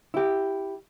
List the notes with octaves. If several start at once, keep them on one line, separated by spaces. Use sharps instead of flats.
E4 G4